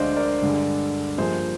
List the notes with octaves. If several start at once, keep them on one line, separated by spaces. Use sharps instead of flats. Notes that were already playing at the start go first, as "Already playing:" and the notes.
Already playing: D2 D3 G#3 D4 C5 D5 D#5 F5
A#4 D5
G2 D3 G#3
G2 F3 A#3 G#4 C5